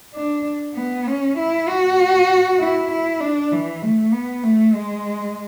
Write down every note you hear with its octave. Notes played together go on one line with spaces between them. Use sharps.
D4
B3
C#4
E4
F#4
E4
E4
D4
E3
A3
B3
A3
G#3